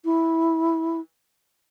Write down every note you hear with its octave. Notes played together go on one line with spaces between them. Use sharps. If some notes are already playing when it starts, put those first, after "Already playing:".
E4